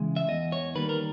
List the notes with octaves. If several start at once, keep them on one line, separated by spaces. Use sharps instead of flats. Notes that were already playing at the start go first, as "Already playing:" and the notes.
Already playing: C#3 E3 G#3
E5
E2 D#5
C#5
D#3 G3 A#3 B4
A#4